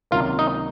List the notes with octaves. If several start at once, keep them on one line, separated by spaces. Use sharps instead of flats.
C#2 C3 D#3 F#3 A#3 F4
D#4